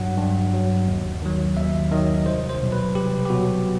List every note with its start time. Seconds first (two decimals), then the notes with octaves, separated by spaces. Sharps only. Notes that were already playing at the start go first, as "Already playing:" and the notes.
Already playing: G2 F#3 F#5
0.18 G2
0.53 F#3
0.88 D#2
1.22 D#3 F#3
1.57 D#2 E5
1.91 D#3 F#3 D#5
2.26 C2 C5
2.49 C5
2.61 B2 F#3
2.72 B4
2.95 C2 G4
3.25 G4
3.29 B2 F#3 F#4